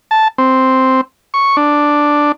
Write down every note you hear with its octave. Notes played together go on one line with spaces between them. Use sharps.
A5
C4
C#6
D4